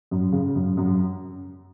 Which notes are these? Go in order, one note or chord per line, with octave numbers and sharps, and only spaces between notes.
F#2
C#3
F#2
F#2